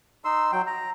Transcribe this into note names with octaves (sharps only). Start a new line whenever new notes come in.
D#4 C6 E6
F#3 G5
A#5